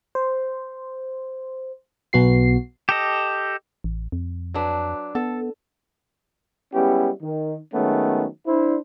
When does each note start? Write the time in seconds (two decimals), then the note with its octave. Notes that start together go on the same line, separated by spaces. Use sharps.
0.15 C5
2.13 B1 B3 F#4 C7
2.89 G4 A4 D#5
3.84 A1
4.12 F2
4.54 F#3 D4 B4
5.15 B3 A4
6.74 G3 G#3 B3 C#4 E4 G4
7.22 D#3
7.74 D#3 F#3 G#3 A3 B3 C#4
8.46 D4 E4 C5